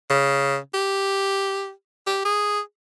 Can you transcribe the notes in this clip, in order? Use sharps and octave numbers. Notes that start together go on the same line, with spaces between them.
C#3
G4
G4
G#4